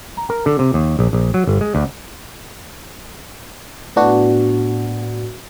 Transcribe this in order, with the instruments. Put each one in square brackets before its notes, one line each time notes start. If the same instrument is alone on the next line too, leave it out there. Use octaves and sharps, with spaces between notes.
[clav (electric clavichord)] A#5
A#4
D3
C3
D#2
A#1
A#1
F#3
G1
G#3
D2
[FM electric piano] A2 B3 D4 F#4